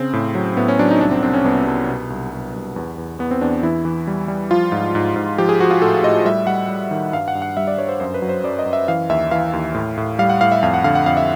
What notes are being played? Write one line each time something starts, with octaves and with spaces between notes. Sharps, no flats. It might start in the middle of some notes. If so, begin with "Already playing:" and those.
Already playing: C#3 C4
A2
F#3
A2 B3
C#4
F#3 D4
D#4
C2 D4
C4
C2 C4
C#4
C2 B3
C2
B2
C2
C2
C2
E2
E2
E2 B3
C4
E2 D4
E3 E4
E3
G3
G3
F3 F4
G#2
G#2
G#2
F3 G4
G#4
F3 F#4
F4
A2 A4
A2 D#5
G3 E5
G3 F#5
G3
D#3
G2 F5
F#5
G2
F#5
G3 E5
D5
G2 C#5
C5
F#2 C5
B4
F#3
C5
F#2 D5
D#5
F#2
E5
E3 F5
D#2 E5
E3 F5
D#2
A2
A2
G3 F5
F#5
A2 F5
E5
F2 F5
F#5
D3 F5
F#5
F2 F5
E5